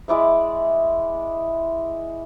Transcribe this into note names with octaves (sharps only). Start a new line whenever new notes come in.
G#3 E4 D5 E5